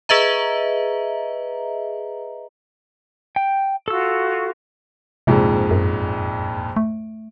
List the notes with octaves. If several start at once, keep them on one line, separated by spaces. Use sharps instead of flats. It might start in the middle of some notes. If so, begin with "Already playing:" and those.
G#4 B4 D#5 E5 A#5
G5
F4 F#4 A4 C#6 E6
A#1 F2 G#2 C3
F#2
A3